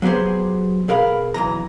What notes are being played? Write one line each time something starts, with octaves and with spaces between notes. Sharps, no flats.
F#3 B3 G4 G#4 C5
B2 G#4 A#4 F5 B5
B1 F#2 E3 A#5